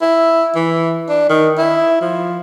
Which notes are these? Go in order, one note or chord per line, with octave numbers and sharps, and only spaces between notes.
E4
E3
D4
D#3
E4
F3